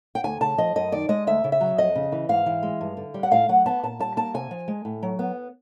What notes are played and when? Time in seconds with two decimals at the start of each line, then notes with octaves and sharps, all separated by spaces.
0.15 G5
0.24 D2 G#5
0.41 C#3 A5
0.58 F3 D#5
0.76 F#2 D#5
0.92 D#3 D5
1.09 G#3 D#5
1.27 D2 E5
1.44 C#3
1.52 E5
1.61 F#3
1.78 F2 D#5
1.96 C#3
2.12 E3
2.29 G#2 F5
2.46 E3
2.63 G#3
2.81 G2
2.97 D3
3.14 G3
3.23 F#5
3.31 A2 F5
3.49 F#3 F#5
3.66 B3 A5
3.83 A#2 A5
3.99 G3 A5
4.17 A#3 A5
4.34 C3 G#5
4.51 F3
4.68 G#3
4.85 A2
5.03 F#3
5.19 B3